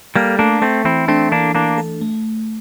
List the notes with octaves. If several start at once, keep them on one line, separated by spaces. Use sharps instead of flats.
G3 A#3 A4
A3 A#3 D4
A3 C4 A4
E3 C4 E4
A3 C4 D4
E3 A#3 D4
E3 A#3 D4
A4
A3